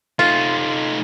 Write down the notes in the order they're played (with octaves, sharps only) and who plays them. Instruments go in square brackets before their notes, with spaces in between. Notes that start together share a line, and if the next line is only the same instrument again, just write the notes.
[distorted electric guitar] A3 D#4 [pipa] F4